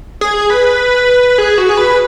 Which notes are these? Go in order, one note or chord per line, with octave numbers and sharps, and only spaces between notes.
G#4
B4
G#4
F#4
G#4
B4